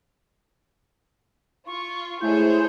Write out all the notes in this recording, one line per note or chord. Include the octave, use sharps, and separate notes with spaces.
F4 C#6
G#3 A3 E4 G#4 C5 C#5 G6